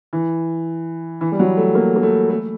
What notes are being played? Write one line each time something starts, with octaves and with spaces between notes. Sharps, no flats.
E3
E3
G3
F#3
A3
A#3
A#3
A3
A3